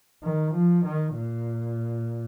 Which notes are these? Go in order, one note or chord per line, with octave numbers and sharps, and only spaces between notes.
D#3
F3
D#3
A#2